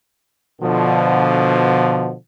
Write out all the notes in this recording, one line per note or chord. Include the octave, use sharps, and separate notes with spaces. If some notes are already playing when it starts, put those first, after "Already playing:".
B2 D3 F3